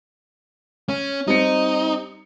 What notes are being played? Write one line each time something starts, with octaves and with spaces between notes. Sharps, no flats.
C#4
G3 C4 D#4 C#7